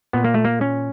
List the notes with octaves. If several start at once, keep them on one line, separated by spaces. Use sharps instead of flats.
A#2 B3
A#3
A3
A#3
C#4